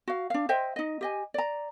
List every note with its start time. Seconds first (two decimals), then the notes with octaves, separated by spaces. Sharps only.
0.08 F#4 F5
0.30 D4 F5
0.49 C5 D#5 E5 G5
0.76 D#4 D#5
1.01 G4 D#5 G#5
1.34 D5 A#5